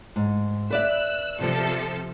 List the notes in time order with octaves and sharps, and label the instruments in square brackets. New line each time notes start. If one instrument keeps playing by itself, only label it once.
[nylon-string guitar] G#2
[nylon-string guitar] B4 D5 E5 [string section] E6 F#6
[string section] C3 F3 A4